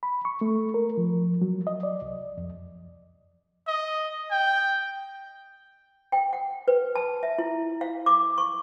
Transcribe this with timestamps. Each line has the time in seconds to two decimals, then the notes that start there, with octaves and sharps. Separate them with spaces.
0.03 B5
0.25 C#6
0.41 A3
0.74 A#4
0.97 F3
1.41 F#3
1.67 D#5
1.83 D5
2.02 C2
2.38 F2
3.68 D#5
4.31 G5
6.12 G5
6.33 F#5
6.68 B4
6.96 A5
7.23 E5
7.38 E4
7.81 F5
8.06 D6
8.38 C#6